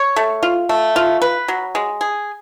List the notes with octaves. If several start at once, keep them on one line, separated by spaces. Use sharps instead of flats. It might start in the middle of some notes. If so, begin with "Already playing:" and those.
Already playing: C#5
A3
F4
A3
F4
B4
F#3
G#3
G#4